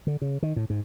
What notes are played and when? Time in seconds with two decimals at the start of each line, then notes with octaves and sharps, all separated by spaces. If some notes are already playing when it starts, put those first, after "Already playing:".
0.07 D3
0.22 C#3
0.43 D#3
0.56 A2
0.70 G#2